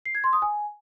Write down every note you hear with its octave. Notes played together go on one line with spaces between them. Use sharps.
C7
G#6
C6
D#6
G#5